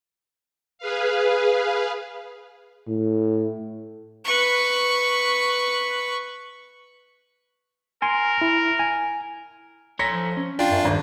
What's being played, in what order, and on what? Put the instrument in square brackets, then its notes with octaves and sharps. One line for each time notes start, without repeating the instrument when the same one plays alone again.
[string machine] G#4 B4 F5
[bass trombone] A2
[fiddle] B4 C#6
[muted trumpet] A#4 [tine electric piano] G#5 C6
[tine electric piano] E4
G#5
[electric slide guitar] A4 C#5 A#5 [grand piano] A#6 B6 C#7
[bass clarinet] F3
[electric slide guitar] C#4
[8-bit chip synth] D4 F4 [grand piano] G5
[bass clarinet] F#2
[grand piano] D#1 G#1 [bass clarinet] G2